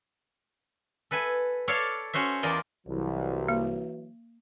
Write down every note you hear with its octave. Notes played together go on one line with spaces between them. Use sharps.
A4 B4 E5 G#5
A4 C#5 D5 E5 F5 A5
C#4 F#4 C5 E5
E2 A#3 F4 D5 D#5
C2 E3 F#3
A#3